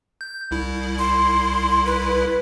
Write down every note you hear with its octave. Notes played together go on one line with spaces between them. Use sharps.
G6
C2 E4
C6
B4